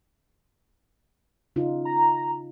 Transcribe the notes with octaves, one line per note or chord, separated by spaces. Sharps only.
C#3 D#4 F4
A#5